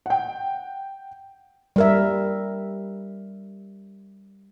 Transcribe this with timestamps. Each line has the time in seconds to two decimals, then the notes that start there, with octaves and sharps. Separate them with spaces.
0.06 F#5 G5
1.76 G3 A#4 E5